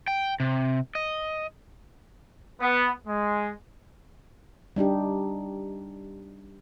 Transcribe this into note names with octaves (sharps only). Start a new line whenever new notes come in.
G5
C3
D#5
B3
G#3
G3 D4 D#4 G4